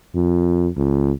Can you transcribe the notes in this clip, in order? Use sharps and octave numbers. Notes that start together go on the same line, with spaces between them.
F2
C#2